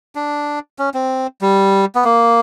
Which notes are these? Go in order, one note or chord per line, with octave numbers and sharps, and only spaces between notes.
D4
C#4
C4
G3
B3
A#3